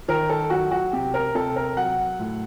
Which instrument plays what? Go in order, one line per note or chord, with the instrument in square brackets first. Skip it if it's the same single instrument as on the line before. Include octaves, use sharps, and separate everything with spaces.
[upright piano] D#3 A#4
A4
F#3 F#4
F#4
C3 G4
A#4
C3 A4
A#4
F#3 F#5
A2